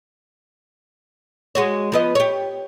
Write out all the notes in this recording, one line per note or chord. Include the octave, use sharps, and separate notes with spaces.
G#3 F#4 C#5
F3 B3 D#5
G4 C#5